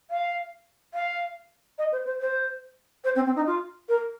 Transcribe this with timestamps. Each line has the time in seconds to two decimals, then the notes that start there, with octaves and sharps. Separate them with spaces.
0.10 F5
0.94 F5
1.78 D#5
1.92 C5
2.05 C5
2.21 C5
3.04 C5
3.15 C4
3.25 C4
3.35 D#4
3.46 F4
3.88 A#4